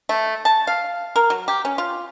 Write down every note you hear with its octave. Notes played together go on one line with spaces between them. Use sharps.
A3
A5
F5
A#4
F#3
G4
C#4
F4